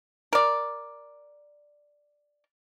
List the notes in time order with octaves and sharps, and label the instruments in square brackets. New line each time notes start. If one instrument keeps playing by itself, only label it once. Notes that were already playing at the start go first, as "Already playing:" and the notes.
[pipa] A#4 D5